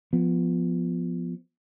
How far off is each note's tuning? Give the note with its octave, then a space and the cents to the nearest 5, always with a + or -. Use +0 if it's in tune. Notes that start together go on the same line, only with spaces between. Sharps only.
F3 +0 B3 +0